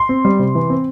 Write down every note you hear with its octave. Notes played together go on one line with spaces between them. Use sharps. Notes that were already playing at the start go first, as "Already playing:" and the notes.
Already playing: C6
C4
G3
C3
E3
C4